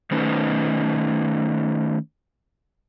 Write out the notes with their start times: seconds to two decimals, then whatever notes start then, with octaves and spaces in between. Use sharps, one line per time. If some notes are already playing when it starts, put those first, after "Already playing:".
0.11 D#3 A3 C#4 D#4 B4 C5